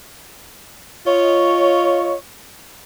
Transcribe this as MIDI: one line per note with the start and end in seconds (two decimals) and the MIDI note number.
1.07 2.15 65
1.07 2.15 73
1.07 2.15 75